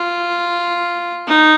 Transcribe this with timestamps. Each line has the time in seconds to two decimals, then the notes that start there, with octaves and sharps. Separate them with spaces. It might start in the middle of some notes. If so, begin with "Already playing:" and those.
Already playing: F4
1.27 D#4